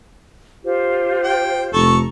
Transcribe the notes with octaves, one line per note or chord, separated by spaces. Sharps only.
F4 G4 C5
G5
F1 A4 A#5 C#6